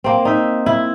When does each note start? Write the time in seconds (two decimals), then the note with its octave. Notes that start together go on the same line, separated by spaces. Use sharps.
0.04 A#3 C4
0.25 D#4 E5
0.66 E4